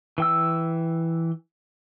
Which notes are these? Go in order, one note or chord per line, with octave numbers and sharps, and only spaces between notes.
E3 G5 E6